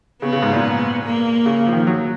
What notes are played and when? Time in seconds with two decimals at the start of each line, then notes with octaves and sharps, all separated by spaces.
0.22 C#3 B3
0.32 C#3
0.43 G#2
0.53 A#2
1.04 A#3
1.46 C#3
1.67 F3
1.73 D#3
1.77 F3
1.87 F#3